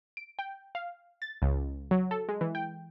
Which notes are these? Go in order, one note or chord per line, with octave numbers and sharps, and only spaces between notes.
D7
G5
F5
A6
C#2
F#3
A4
G#3
E3
G5